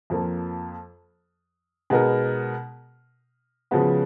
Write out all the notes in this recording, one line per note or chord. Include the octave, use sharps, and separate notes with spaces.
F2 F3 A#3
B2 G#3 B3 D#4 A#4
C#3 F3 G#3 B3 F#4